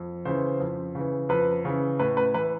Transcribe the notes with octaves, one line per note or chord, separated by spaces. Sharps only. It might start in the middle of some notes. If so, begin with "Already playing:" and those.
Already playing: F2
C#3 E3 C5
F2
C#3 E3
F2 B4
C#3 E3
A2 B4
B4
E3 B4